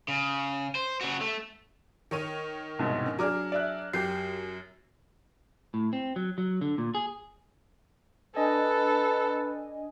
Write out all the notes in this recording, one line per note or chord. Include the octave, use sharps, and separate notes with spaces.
C#3
C5
C#3 F#4
A3
D#3 C#5 D#7
C2 G#2 B2
C#4
F#3 D4 G#4 A#5 D6 F6
D5 E5 F#6
F#2 G4 G6 C7
A2
C4
F#3
F#3
D3
A#2
G#4
D4 A4 B4 D#5 G#5